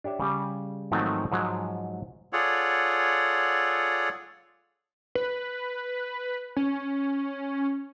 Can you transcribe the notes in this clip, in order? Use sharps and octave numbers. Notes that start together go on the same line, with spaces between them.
D4 G4 C#5 E5
C#3 G3
G#2 D#3 F3 F#3 A3 C4
G#2 F3 F#3 G#3
F4 G#4 A4 C#5 D5 F#5
B4
C#4